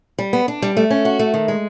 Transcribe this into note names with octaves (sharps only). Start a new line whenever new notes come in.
G3
B3
D4
G3
A3
C#4
F#4
A3
D#3
G#3